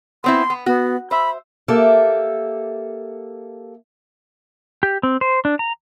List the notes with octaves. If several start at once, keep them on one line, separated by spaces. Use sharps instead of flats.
B3 C4 E4 C6
B3
B3 F#4
C5 E5 B5
A#3 G4 A4 E5
G4
C4
C5
D4
A#5